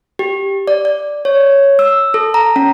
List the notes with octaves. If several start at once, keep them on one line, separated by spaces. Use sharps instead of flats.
G4
D5
D5
C#5
E6
A4
A#5
C#4